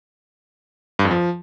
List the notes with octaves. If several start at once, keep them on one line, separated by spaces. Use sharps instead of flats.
G2
F2
F3